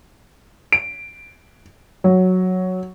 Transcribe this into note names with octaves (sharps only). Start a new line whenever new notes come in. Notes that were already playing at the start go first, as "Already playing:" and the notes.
D7
F#3